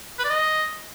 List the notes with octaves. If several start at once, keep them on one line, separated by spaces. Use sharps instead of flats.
B4
D5
D#5